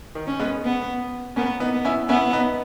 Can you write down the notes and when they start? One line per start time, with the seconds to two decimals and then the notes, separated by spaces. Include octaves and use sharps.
0.15 D#3
0.27 C#4
0.39 G#3 B3
0.64 B3
1.36 A#3 B3 C#4
1.60 B3 D#4
1.73 B3
1.85 C#4 E4
2.09 B3 C#4 E4
2.33 B3 D#4